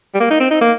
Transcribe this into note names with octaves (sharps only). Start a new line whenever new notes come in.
G3
A#3
D#4
C4
D#4
A#3